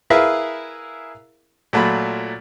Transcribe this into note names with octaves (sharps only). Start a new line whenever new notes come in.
E4 G#4 A#4 B4 E5 F5
A#2 F#3 A3 F4 B5